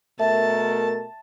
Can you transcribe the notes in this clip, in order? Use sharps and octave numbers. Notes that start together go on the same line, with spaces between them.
B2 A3 A#4 E5 A5